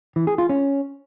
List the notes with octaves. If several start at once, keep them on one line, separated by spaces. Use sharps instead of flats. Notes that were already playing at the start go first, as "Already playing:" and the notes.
E3
G#4
F4
C#4